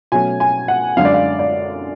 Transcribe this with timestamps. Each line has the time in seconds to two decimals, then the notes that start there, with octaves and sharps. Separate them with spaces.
0.12 B2 F#3 A3 C#4 G#5
0.40 G#5
0.68 F#5
0.97 F#2 D3 G#3 F5
1.05 D5
1.14 F5
1.39 D5